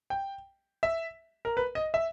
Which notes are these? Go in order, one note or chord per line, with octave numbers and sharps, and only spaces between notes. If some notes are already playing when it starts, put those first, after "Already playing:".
G5
E5
A#4
B4
D#5
E5